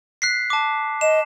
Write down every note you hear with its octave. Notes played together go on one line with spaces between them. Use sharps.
F#6 B6 C7
A5 D6
D#5 E7